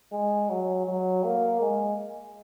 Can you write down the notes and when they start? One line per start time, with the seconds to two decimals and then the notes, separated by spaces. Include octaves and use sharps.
0.12 G#3
0.50 F#3
0.87 F#3
1.24 A#3
1.61 G#3